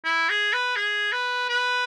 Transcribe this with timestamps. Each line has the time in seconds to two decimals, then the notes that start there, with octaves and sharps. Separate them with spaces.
0.04 E4
0.29 G#4
0.53 B4
0.76 G#4
1.13 B4
1.49 B4